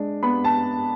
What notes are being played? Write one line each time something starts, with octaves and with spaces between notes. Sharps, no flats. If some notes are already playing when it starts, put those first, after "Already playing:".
Already playing: G#3 D4
B3 B5
A5